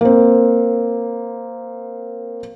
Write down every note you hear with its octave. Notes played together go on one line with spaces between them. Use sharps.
A#3 C4